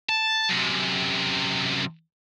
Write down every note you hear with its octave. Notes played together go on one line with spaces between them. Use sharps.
A5
F#2 C3